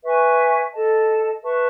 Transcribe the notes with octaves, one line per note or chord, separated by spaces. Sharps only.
B4 E5 G#5 C#6
A4 D#5 A5
B4 E5 A5 C#6